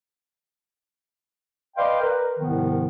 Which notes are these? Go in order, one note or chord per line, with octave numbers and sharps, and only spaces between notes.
B4 D5 D#5 F5 G5 C6
A#4 B4
C2 G#2 C3 D#3 F3 B3